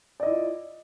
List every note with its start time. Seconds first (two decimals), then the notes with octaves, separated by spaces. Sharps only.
0.20 D5
0.23 D#5
0.26 E4
0.29 F4